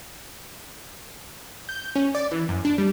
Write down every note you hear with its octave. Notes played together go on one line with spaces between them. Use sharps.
G6
C#4
D5
E3
F#2
D4
G3